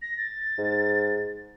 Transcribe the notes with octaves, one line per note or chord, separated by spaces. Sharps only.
A#6
A6
G#2